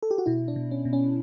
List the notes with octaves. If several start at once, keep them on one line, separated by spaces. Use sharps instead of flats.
A4
G4
F#4
B2 E4
D4
B2
C#4
B2
C#4